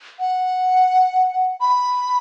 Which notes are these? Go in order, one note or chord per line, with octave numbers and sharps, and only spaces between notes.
F#5
B5